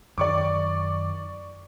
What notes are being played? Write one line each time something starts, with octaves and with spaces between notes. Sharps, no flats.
F#2 D#3 D5 C#6 D6